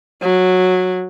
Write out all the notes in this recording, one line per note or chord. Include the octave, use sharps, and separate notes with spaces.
F#3